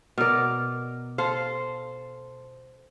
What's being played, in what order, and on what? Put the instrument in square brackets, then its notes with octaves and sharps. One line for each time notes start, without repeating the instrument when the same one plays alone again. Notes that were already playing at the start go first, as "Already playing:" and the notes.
[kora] B2 A#4 [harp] D5 F6
[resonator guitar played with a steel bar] A4 C5 [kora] F5